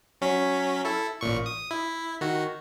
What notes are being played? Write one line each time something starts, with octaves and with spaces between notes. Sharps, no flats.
F#3 C#4 B6
E4 A4
A1 A#2 C#6
D#6
E4
D#3 F#4